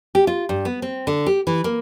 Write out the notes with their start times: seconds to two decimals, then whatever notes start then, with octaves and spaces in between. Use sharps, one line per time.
0.15 G4
0.27 F4
0.49 G2
0.65 B3
0.82 C4
1.07 D3
1.26 G4
1.47 E3
1.64 A#3